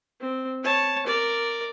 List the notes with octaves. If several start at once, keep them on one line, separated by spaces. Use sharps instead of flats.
C4
C#5 A5
A#4 D5